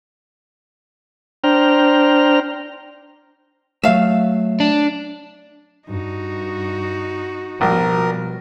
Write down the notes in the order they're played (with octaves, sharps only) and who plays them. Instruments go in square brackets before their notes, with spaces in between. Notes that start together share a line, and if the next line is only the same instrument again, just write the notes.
[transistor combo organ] D4 C5 G5 A#5 F6
[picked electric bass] F#3 A3 [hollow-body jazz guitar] E5 F5
[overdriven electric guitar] D4
[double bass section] G2 [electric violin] D#4 F#4
[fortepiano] A#1 [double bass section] B2 F3 G3 [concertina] A#4